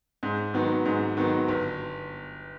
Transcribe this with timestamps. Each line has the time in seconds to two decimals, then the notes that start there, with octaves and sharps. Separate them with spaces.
0.23 G#2
0.54 D#3 F#3 B3
0.86 G#2
1.17 D#3 F#3 B3
1.48 G1